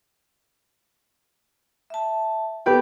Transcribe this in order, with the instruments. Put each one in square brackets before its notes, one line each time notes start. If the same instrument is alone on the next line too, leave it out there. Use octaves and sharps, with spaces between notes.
[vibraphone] E5 A5
[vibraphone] B3 C4 A4 [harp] G4 B4 G5